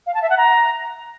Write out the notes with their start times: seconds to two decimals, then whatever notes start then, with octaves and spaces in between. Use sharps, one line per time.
0.06 F5
0.14 A5
0.22 E5
0.30 F#5
0.37 A#5